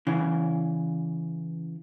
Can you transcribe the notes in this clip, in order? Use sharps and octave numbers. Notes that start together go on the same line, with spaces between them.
C#3 E3